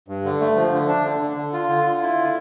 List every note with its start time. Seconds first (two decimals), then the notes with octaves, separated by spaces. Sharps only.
0.08 G2
0.25 D3
0.40 A3
0.56 F3
0.73 D3
0.88 D4
1.05 D3
1.21 D3
1.37 D3
1.54 F4
1.69 D3
1.86 F4
2.02 E4
2.18 D3